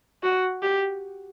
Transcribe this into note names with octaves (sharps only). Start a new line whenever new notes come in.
F#4
G4